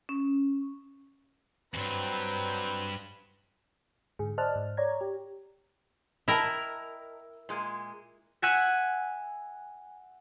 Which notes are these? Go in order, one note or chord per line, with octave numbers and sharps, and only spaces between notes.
C#4
E2 G2 F#3 C4 B4
G#2 D3 G#4
C5 D5 D#5 A5 F6 F#6
G#2
C#5 D5 A#5 G#6
G4
E4 A#4 D#5 G5 A5
A#2 G#3
E5 F#5 G#5 E6 F#6 B6